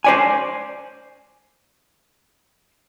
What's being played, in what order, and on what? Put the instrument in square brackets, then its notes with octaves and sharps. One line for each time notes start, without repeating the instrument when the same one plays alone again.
[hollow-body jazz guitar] C5 D5 G#5